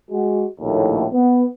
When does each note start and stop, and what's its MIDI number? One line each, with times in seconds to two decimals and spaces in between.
0.11 0.46 56
0.11 0.46 66
0.61 1.05 34
0.61 1.05 39
0.61 1.05 45
1.13 1.44 59